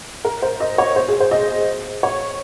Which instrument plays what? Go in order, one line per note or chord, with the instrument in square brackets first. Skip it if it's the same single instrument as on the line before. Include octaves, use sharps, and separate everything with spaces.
[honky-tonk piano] A#4
C5
D#5
C#5
C5
G#4
C5
D#5
C#5